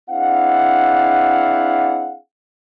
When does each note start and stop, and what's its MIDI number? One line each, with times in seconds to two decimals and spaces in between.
0.10 2.17 60
0.10 2.17 62
0.10 2.17 64
0.10 2.17 68
0.10 2.17 77
0.10 2.17 78